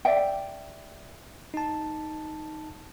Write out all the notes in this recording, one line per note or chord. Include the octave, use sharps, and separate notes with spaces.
D5 E5 G5
D#4 A5